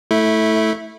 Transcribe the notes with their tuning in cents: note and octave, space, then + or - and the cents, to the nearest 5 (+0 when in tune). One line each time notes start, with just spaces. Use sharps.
A3 +0 E4 -15